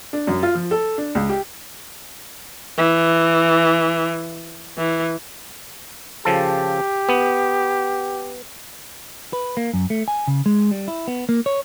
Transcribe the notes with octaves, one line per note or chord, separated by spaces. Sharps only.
D4
F#2
F4
F3
A4
D4
C#2
G4
E3
E3
C#3 F3 G4 A4
B3
B4
A#3
F#2
A3
G#5
C#3
G#3
G3
E4
B3
A#3
C#5